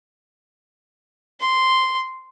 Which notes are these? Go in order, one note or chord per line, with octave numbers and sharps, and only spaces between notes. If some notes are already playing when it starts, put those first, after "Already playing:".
C6